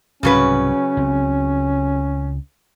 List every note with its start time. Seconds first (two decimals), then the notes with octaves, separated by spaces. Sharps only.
0.23 C2 G#2 C#3 F#3 C#4 B4
0.97 C#2 C4